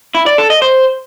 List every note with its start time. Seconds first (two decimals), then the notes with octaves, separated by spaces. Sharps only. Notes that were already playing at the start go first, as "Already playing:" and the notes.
0.15 E4
0.26 D5
0.38 A4
0.50 D#5
0.62 C5